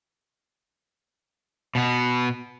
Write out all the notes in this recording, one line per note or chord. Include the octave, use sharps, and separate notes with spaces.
B2 B3